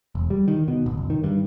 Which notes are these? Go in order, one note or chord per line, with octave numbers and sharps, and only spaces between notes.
E1
G3
D#3
B2
D1
F#1
D#3
G2